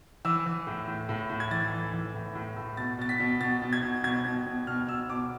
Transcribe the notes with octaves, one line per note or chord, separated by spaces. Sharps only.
E3 E6
E3
A2
A2
A2
A2
G#6
E3 A6
E3
E3
A2
A2
A2
B2 A6
B2 A6
B6
B2
B2 A6
B2
G#6
B2
B2 G#6
B2
B2
B2 F6
B2 E6
B2 D6